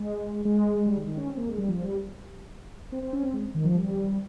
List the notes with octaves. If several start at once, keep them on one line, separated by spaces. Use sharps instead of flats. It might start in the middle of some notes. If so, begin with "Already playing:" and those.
Already playing: G#3
G#3
G3
D#3
D#3
C#4
C4
A#3
G#3
G3
F3
G3
C4
C4
C#4
C4
G#3
D#3
F3
G3